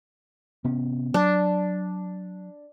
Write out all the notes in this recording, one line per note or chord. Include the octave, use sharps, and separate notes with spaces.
C3 B3 C#4
F#3 D4